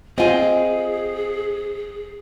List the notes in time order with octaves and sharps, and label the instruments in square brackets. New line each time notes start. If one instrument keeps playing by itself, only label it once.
[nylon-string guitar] C4 F4 [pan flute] G#4 [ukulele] D#5 G#5